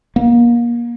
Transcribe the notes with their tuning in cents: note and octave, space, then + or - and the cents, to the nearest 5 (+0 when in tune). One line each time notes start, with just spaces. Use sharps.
A#3 +30